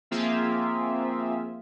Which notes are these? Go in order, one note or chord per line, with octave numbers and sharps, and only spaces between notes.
F3 A#3 C4 F4 G#4 E5